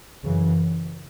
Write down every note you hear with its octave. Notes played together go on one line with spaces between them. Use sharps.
F#2 C#3 E3